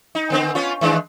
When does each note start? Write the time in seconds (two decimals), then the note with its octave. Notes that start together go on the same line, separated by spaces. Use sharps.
0.15 D#4
0.30 D3 B3 C4
0.55 B3 C#4 F4
0.81 D#3 G#3 D4